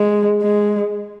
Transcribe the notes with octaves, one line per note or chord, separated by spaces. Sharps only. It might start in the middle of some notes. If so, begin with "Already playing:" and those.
Already playing: G#3
G#3